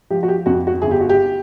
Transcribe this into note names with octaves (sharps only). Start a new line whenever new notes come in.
F3 G4
F#4
G4
F2 F#4
F#4
G1 G#4
G4
F#4
G4